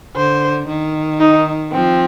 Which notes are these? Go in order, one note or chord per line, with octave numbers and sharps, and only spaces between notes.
D3 C5
D#3
D#4
F3 C4